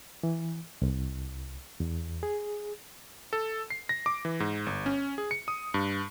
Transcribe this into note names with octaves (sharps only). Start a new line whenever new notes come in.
E3
C2
E2
G#4
A4
C7
A#6
D6
E3
G#2
G1
C#4
G#4
C#7
D#6
G2